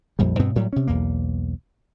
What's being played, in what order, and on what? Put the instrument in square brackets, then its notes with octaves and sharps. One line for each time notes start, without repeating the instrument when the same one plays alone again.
[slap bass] A#1 F2 A#2 G3
G2 B2 B3 C4
A2 F#3 G3
C3 C#4
B1 E2 A#3